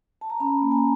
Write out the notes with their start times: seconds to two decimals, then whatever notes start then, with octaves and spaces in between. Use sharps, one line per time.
0.21 A5
0.30 A#5
0.40 C#4 A5 B5
0.62 A#3
0.71 G#5 A#5